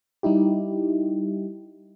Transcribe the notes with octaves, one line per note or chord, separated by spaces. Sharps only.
G3 D#4 E4 G4